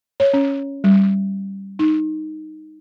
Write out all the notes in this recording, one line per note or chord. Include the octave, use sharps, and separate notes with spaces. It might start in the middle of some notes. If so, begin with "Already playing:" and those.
C#5
C#4
G3
D#4